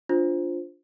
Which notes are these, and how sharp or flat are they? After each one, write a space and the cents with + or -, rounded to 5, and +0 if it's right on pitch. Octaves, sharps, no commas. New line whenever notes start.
D4 -10 F4 +0 C5 +0